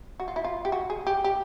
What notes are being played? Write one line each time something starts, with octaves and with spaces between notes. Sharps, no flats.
F#4
F4
E4
F4
G4
F#4
G#4
G4
G4